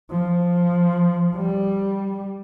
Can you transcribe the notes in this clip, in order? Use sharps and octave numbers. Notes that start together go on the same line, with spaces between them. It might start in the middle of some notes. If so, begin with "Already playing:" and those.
F3
G3